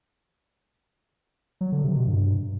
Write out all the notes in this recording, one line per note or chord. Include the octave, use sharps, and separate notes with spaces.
F#3
D3
C3
B2
G2